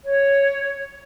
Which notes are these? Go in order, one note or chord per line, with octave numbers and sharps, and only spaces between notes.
C#5